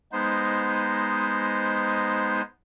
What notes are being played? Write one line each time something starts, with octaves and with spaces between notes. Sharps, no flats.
G#3 B3 D#4 C5